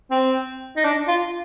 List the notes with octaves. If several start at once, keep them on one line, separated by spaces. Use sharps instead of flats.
C4
D#4
D4
F4